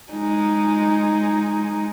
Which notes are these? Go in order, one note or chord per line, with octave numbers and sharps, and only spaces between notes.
G#3 D#4